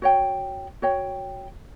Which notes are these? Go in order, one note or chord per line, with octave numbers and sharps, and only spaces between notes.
F#4 C#5 G5
F#4 C#5 G5